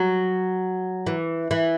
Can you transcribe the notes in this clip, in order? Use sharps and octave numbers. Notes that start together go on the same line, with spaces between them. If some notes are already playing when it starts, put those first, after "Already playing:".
Already playing: F#3
E3
E3